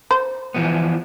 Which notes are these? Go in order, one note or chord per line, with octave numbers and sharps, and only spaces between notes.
C5
E3 F3 B3